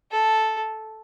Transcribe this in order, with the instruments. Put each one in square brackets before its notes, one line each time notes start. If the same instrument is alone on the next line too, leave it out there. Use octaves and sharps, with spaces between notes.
[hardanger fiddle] A4